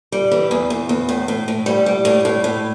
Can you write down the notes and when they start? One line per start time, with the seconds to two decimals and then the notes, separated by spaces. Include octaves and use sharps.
0.12 G3
0.31 E3
0.51 E2
0.70 E2
0.89 E2
1.09 A2
1.28 A2
1.48 A2
1.66 G3
1.86 G3
2.05 A2
2.25 A2
2.44 A2